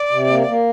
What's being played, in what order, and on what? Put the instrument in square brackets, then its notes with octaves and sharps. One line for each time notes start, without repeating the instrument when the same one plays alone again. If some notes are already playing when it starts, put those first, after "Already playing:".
Already playing: [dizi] D5
[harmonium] C3
A#3
A#3